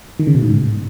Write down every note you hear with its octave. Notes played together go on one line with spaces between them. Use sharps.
D#3
C#3
B2
A2
G#2